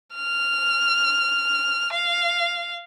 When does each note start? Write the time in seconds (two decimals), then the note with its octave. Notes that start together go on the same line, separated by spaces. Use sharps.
0.15 F6
1.93 F5